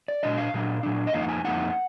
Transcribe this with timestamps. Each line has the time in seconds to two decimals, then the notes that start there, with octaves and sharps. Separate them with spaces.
0.08 D5
0.23 A#2 F#3 D4 D#5
0.38 F5
0.54 A#2 F#3 D4
0.83 A#2 F#3 D4
1.07 D#5
1.14 F2 F3 A#3 D#4 F5
1.22 F#5
1.29 G#5
1.44 F2 F3 A#3 D#4 F#5